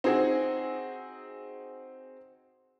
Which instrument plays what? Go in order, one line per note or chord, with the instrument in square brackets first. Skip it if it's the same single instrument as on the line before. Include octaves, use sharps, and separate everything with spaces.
[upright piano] C4 D#4 F#4 G#4